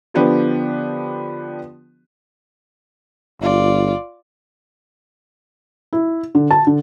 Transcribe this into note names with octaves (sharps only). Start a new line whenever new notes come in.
D3 F3 B3 D4 G4
G1 F4 D5
E4
D3
A5
D3